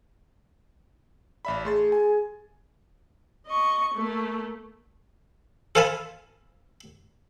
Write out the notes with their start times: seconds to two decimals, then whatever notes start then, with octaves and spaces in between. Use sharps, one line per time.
1.45 A1 D5 E5 B5
1.65 A3 G#4 C6 A6
1.92 G#5
3.48 D#5 C#6
3.94 A3 A#3
5.75 A4 C5 F5 G#5 A5 B5